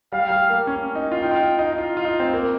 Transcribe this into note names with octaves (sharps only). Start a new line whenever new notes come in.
G3 F5
G3
A#3
C#4
D#4
F4
D#4 G5
F4
D#4
D#4
D#4
F4
F4
D#4
C4
A#3